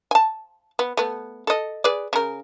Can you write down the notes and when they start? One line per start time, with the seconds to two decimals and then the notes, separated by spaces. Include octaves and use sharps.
0.11 G#5 A5
0.79 B3
0.97 A3 B3
1.47 A4 D#5
1.84 G#4 B4 D5
2.13 C#3 A#4